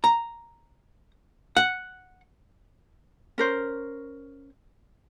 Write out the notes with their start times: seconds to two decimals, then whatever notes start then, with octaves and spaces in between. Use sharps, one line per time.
0.04 A#5
1.57 F#5
3.38 C#4 A#4 C5